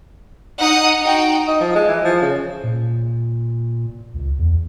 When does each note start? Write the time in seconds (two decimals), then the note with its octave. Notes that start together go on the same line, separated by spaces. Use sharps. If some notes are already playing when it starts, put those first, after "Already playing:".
0.59 D#4 F#5 D#6 C#7
1.03 D#4 F#4 G5
1.48 D#4
1.60 F3
1.75 G#3
1.88 E3
2.04 F3
2.22 C#3
2.63 A#2
4.14 C#2
4.39 E2